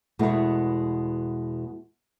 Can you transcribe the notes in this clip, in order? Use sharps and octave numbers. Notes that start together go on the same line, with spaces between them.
E2 B2 G#3 A3 E4